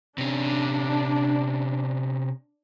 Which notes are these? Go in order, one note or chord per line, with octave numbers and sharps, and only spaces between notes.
C3 C#4 D4